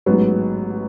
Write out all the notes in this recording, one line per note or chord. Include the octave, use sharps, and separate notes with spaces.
A1 G#2 F#3 B3